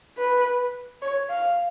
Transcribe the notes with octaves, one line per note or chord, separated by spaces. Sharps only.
B4
C#5
F5